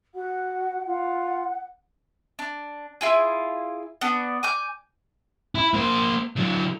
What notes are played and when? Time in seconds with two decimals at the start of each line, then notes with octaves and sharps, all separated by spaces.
0.15 F#4 F#5
0.86 F4 F#5
2.39 D4
3.01 E4 F4 G#4
4.01 B3 D4
4.43 G#5 D6 G6
5.55 E4
5.74 A#3 C5
6.36 D3 F#3